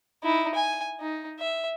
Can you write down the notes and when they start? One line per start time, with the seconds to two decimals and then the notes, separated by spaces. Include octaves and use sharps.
0.23 D#4 E4
0.55 G#5
1.00 D#4
1.40 E5